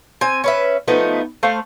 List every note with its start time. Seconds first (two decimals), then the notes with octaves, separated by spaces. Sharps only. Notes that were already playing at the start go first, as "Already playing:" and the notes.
0.21 C4 G#5
0.44 C#4 B4 E5
0.88 F3 A3 B3 D#4
1.43 A3 C5 F5